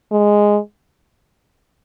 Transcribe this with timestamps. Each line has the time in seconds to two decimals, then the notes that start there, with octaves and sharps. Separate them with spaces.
0.12 G#3